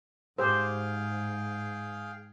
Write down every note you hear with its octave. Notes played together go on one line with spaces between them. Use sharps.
G#2 G4 G#4 C5 F5 G5